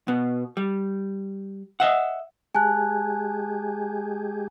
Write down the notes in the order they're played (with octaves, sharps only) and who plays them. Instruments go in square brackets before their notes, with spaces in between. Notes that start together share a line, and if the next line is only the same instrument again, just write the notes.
[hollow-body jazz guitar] B2 B3
G3
D#5 E5 F#5
[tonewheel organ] G#3 G4 G#4 [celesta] G#5 A5 F#6